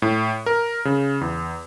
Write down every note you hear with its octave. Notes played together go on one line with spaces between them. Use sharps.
A2
A#4
C#3
E2